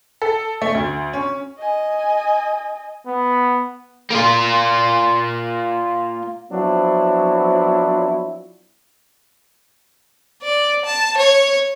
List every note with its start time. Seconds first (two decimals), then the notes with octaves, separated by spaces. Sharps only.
0.22 A4
0.62 A3
0.75 D2
1.13 C#4
1.59 D#5 G#5
3.07 B3
4.11 A#3 F4
6.51 F3 F#3 B3 C4 D4 E4
10.43 D5
10.85 A5
11.17 C#5